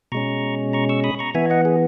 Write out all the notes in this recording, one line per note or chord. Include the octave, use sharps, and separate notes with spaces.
B2 G#3 C#4 A#5 C#6
A#5 C#6
C#6 E6
B5 D#6
A#5 C#6
E3 B3 E5 G#5
D#5 F#5
G#4